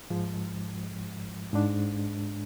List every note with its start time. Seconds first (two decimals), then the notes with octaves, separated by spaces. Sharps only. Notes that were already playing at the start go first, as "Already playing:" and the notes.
0.10 G#2 F3 G#3
1.53 G#2 G#3 D4